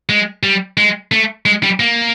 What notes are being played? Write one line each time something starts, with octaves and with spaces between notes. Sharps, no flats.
G#3
G3
G#3
A3
G#3
G3
A#3